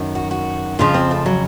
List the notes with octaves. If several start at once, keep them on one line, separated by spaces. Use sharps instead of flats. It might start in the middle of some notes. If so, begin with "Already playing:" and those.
Already playing: F#2 D#3
F#4
F#4
F2 C#3 F3 F4
C4
A3
F#3